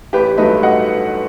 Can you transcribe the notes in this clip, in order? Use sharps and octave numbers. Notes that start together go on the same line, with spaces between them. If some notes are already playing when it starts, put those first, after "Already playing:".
A1 G4 B4
G2 F#3 A3 B4 D#5
D#5 F#5